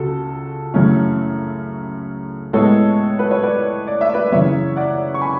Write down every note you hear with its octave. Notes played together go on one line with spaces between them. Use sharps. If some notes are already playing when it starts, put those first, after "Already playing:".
Already playing: C#2 C#3 F#4 A4
F#2 C#3 E3 A3 C#4
A2 G#3 B3 A4 C#5
B4
C#5
B4 D5
D5
E5
B4 D5
F#2 C#3 E3 C#5 E5
D5 F#5
C#6
G#5 B5